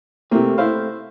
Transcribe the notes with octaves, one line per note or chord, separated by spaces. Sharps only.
C3 A3 A#3 C4
E4 C5 F5